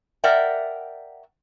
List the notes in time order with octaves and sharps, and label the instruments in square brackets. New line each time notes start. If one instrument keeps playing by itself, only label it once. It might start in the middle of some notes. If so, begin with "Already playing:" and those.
[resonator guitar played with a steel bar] A#4 D5 E5 F#5 G5